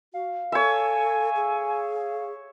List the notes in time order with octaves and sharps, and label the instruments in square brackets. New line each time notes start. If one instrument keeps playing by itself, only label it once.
[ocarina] F#4 [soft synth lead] F5
[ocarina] A4 [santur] C#5 E5 [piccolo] G#5
[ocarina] G#4